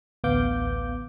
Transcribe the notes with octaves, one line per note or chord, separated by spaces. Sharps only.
A1 D2 B3 F5 D6 G6